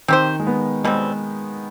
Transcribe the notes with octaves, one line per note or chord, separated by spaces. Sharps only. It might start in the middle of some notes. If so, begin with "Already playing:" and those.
D#3 C4 G4 C5
G#3
B3
B2 G3 G#3 C4